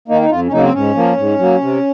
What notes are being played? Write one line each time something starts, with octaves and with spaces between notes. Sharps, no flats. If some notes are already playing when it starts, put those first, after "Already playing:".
D#3 A#3 D#4
D#4
F2 F4
C#4
C#3 F#3 A#3 D#4
C4
G#2 C#4
F3 A#3
G#2
F#3 A#3
C3